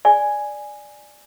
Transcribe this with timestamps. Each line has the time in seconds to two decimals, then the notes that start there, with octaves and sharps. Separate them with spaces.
0.05 D5 G#5